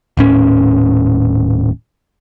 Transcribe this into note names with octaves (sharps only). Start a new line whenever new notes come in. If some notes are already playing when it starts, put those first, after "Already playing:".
D#1 A2 C#4